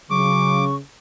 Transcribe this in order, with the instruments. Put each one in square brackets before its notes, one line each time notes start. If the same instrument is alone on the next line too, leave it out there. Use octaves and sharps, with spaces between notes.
[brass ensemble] C#3 [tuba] F#3 [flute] C#6 [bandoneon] D6